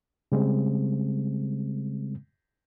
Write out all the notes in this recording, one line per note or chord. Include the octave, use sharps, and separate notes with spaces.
C#3 G3 G#3 C4